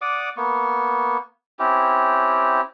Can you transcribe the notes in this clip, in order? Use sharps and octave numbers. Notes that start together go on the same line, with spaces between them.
D5 F#5 D6 D#6
A#3 B3 C#6
C4 C#4 E4 G4